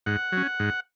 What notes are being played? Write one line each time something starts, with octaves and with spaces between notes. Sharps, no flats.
G#2 F#5
F#3 C#4
G#2